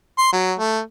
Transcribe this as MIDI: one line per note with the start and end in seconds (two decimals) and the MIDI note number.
0.18 0.29 84
0.33 0.54 54
0.60 0.80 57